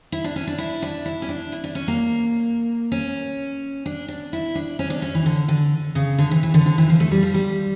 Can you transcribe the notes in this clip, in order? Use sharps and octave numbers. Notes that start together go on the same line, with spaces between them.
E4
D4
C#4
D4
E4
D4
E4
C#4
D4
E4
D4
C#4
A#3
C#4
D4
D4
E4
D4
C#4
D4
C#4
E3
D3
D3
C#3
D3
E3
E3
D3
D3
E3
F3
A3
G3
F3
G3